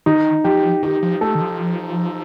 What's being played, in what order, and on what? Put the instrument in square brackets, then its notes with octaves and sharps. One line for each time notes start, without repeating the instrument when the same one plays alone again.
[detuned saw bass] D#3 [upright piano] D#4
[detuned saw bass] F3 [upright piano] G4
[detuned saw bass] D#3 [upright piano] G4
[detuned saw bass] F3
[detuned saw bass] A3 [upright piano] A4
[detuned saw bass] D#3
F3